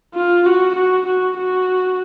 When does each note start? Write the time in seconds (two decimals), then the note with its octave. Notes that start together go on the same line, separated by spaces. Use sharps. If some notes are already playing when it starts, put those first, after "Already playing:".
0.15 F4
0.46 F#4
0.76 F#4
1.06 F#4
1.37 F#4